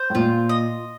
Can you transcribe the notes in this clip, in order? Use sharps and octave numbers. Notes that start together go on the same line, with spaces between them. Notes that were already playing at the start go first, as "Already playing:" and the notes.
Already playing: C5
A2
A#2 F4
D#5